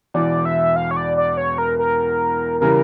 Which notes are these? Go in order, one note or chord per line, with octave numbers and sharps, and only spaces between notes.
E1 E2 E3 D5
E5
F5
C#5
D5
D5
C#5
A#4
A#4
C#3 E3 G3 A#4